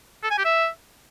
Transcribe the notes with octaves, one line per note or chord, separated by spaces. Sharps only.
A4
G#5
G4
E5